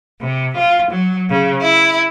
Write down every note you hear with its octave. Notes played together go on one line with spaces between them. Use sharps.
C3
F4
F#3
C#3
E4